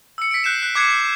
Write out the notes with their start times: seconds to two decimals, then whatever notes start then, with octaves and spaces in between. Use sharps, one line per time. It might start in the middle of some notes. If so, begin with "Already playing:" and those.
0.18 E6 C#7
0.31 B6 D7
0.44 F#6 G6 C7 E7
0.62 F#6
0.75 D6 F#6 G#6 C7 C#7